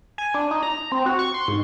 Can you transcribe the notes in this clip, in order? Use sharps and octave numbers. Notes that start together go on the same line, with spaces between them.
G#5
D4
D#4
A#5
C4
F#4
C#6
C6
G#2